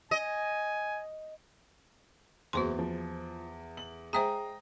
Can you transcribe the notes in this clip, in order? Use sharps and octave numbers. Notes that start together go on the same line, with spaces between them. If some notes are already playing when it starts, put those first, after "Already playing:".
D#5 G#5
F#1 E2 F#4 C5 C6
F3
F#7
G#3 C5 E5 G5 G#5 A#5 D#6